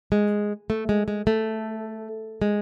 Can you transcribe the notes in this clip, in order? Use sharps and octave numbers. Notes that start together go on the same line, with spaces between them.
G#3
A3
G#3
G#3
A3
G#3